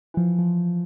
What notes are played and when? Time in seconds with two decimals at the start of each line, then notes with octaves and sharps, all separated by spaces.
0.14 E3 F3
0.39 F3